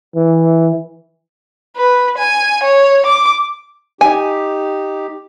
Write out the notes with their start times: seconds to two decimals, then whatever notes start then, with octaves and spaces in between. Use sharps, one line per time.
0.16 E3
1.77 B4
2.18 G#5
2.63 C#5
3.06 D6
4.01 D#4 G4 G#5